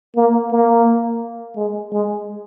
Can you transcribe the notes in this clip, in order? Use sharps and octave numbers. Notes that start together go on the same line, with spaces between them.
A#3
A#3
G#3
G#3